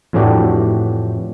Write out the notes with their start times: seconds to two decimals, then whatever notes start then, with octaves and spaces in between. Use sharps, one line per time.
0.13 F2 A2 E3 D4 F#4 G4